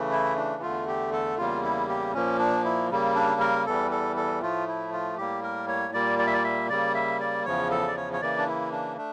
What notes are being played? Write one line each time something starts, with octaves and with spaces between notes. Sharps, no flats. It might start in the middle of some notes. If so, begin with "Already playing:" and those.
Already playing: C#3 E3 A3
E4
D4
E2 D3 A3 F4
G4
A4
E2 C#3 G3 A#3 F4
E4
G4
A#2 F3 A#3 C#4
D4
E4
C#3 G3 A#3
D4
A#4
E2 E3 G3 A4
A4
A4
A2 F3 A3 F4
E4
F4
A2 G3 A#3 G4
A#4
C#5
A#2 G3 A#3 D5
D5
E5
D5
E5
C#3 G3 A#3 D5
E5
D5
E2 C#3 F3 C#5
A4
D5
C#5
C#5
C#3 E3 A#3 D5
D4
E4
D4
A3 D4